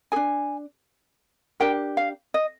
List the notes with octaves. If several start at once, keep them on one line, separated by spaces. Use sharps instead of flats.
D4 G#4 G#5
D4 G4 A#4 G5
F5
D#5